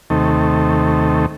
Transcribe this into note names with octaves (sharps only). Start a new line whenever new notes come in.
D#2 C3 D#3 A3